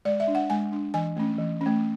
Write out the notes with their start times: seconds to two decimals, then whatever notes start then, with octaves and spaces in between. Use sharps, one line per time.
0.05 G#3 D5
0.20 E5
0.28 D4
0.35 F#5
0.50 G#3 G#5
0.72 D4
0.94 E3 G#5
1.16 A3 C#4
1.39 E3
1.61 A3 C#4